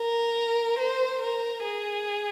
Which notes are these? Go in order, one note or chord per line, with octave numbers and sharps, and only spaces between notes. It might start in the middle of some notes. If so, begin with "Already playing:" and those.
Already playing: A#4
C5
A#4
G#4